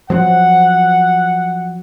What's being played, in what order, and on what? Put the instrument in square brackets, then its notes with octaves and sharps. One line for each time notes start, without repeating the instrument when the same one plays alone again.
[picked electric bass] F3 F#3 C4 [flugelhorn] F#5